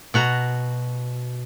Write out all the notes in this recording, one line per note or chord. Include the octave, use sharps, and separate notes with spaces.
B2 F#4 A#5